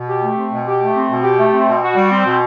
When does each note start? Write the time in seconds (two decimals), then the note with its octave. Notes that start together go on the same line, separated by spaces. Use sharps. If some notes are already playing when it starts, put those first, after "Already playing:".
Already playing: B2
0.08 G4
0.22 A3
0.36 C4
0.52 B2
0.67 G4
0.81 A3
0.96 C4
1.09 B2
1.23 G4
1.39 A3
1.52 C4
1.67 B2
1.82 F#4
1.96 G3
2.11 C4
2.26 B2